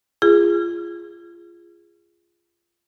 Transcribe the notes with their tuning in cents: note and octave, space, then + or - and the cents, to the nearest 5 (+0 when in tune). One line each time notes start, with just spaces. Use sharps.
F4 -25 G#4 -15